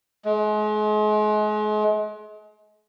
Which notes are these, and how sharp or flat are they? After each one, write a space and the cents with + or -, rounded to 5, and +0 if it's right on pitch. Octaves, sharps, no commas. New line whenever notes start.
G#3 +35